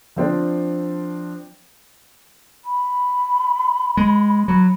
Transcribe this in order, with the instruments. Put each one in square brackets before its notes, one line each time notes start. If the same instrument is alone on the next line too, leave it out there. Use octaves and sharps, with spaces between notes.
[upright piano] F3 C4 D4
[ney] B5
[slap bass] G#3
F#3